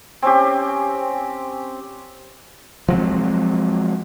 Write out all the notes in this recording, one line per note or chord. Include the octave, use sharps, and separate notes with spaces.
C4 C#4 G4
F3 F#3 G#3 C4